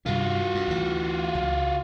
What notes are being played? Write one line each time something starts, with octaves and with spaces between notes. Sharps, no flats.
G2 C3 D#3 F4 F#4
G2
D2 E3
C#2